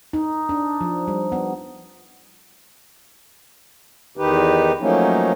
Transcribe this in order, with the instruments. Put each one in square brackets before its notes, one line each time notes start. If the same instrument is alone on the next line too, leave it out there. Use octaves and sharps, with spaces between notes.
[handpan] D#4
D4
F3
G3
B3
[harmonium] E2 D#3 D#4 G4 B4
F3 F#3 A3 A#3 C#4 D#4